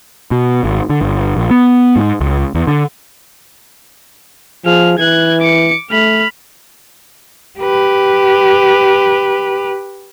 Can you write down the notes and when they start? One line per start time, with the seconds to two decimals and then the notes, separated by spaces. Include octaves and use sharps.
0.31 B2
0.64 G#1
0.90 D3
1.02 G1
1.37 A#1
1.51 B3
1.96 G#2
2.21 C#2
2.55 E2
2.67 D3
4.65 F3 G#4 F6
4.99 E3 F#6 G#6
5.41 D6 C#7
5.91 A3 B5 F6
7.60 G4 B4